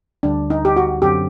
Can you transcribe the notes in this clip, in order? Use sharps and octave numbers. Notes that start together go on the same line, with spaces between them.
D2 D3 G3 D4
D#4
G4
F#4
F#2 D3 F#3 C4 G4